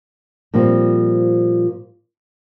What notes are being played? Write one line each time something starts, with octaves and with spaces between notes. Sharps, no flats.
A#2 F3 G3 C4